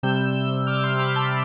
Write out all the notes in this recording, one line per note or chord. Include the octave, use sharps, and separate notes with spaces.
C3 G3 E6 G6
E6 G6
E6 G6
D6 F6
C6 E6
B5 D6
A5 C6